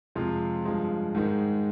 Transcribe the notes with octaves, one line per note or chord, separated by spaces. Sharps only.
F2 C3 F3 G#3 F4
G2 F3 G#3
G#2 D#3 G#3